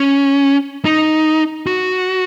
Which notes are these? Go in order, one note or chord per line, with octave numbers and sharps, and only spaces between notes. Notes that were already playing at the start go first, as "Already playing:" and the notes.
Already playing: C#4
D#4
F#4